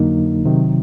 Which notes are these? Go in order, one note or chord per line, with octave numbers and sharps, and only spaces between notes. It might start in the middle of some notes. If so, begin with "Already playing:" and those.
Already playing: F2 D3 F#3 A#3 D#4
C3 D#3 F#3